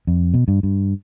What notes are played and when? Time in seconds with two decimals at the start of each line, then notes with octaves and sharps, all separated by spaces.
0.07 F2
0.34 B2
0.48 G2
0.63 G2